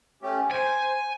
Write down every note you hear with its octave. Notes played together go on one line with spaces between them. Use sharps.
A3 C#4 G4
C5 G#5